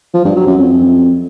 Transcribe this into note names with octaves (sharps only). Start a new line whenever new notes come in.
F3
G2
F#3
F#2
F2